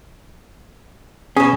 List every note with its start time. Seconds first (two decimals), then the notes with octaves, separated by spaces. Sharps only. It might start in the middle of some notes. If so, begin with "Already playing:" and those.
1.37 B2 C#4 G#4